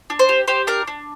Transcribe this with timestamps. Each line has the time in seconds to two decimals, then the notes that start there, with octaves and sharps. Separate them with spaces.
0.10 D4
0.19 C5
0.29 G4
0.48 G4 C5
0.67 D4 A#4
0.87 D4